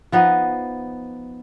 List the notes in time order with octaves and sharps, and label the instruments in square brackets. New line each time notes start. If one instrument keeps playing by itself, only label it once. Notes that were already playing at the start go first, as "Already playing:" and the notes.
[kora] F3 B3 D#4